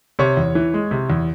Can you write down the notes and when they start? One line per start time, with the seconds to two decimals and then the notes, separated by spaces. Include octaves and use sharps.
0.19 C3 C#5
0.37 E2
0.55 E3
0.74 G#3
0.91 C3
1.10 E2